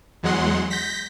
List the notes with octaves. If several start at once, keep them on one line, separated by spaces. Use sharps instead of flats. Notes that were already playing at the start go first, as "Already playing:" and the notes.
E2 F#3 G#3 F#5 C6
G6 A#6 B6